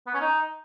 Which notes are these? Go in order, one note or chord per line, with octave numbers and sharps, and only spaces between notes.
B3
C#4
D#4